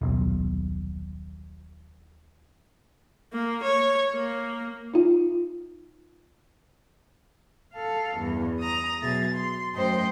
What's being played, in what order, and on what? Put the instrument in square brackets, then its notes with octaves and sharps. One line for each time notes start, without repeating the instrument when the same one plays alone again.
[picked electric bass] D#1 B1
[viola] A#3
C#5
A#3
[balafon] D#4 F4
[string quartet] A4 F5
E2 G2
A#5 D#6
B2 F#3 G#4 E5 A6
C6
F#2 A3 C5 D#5 G5 C6